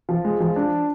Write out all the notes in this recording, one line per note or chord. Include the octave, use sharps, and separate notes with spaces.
F3
G#3
F3
D4